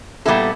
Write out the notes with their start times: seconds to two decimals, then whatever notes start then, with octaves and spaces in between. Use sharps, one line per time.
0.26 A#2 G3 B3 E4 A4